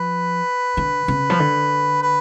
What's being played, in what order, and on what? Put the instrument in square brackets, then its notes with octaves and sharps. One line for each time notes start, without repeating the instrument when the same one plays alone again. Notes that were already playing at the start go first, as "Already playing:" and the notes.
Already playing: [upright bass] F3 [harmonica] B4
[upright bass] D3
C#3
F3
D3
[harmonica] B4